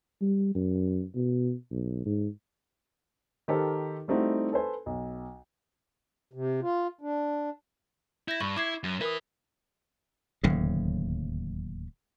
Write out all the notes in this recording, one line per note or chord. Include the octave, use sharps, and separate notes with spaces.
G3
F#2
B2
B1
G#2
D#3 D#4 G4 A4 A#4 C5
G3 A3 C4 D#4 E4 F#4
A4 B4 C5 G#5
B1
C3
F4
D4
E4 G6 A#6
G2 B5 C#6
E4 D6 G#6 C7
F#2
E4 A#4 B4 D#6
D1 D#2 C#3 F#3